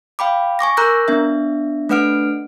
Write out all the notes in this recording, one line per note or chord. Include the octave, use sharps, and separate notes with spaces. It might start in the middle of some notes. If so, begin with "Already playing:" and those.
F5 G5 B5 D6
G#5 C#6 D6 A#6
A#4 A#5 E6 F#6 G6 A#6
B3 D4 E5
A3 D4 B4 F#5 F6 D7